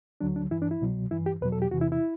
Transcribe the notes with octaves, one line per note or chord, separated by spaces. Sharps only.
D2 D3 F#3 D4
D4
G2 E3 E4
D4
E4
C2 B2 F#3
G2 E3 E4
G4
E2 B2 F#3 B4
A4
G4
E2 C3 E3 F#4
E4
E4